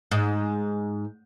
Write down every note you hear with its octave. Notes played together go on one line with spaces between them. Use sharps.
G#2